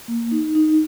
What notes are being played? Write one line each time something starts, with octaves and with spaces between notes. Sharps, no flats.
A#3
D#4
D#4